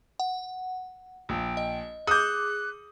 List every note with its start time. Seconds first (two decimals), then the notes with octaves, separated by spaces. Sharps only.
0.20 F#5
1.29 A#1 G5
1.57 D#5
2.07 G#4 D6 D#6 F#6 G6